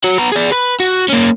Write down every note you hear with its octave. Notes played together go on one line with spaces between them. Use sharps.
F#4 C#5
B3 A#5
G#4 D5
B4
F#4
A#3 C#4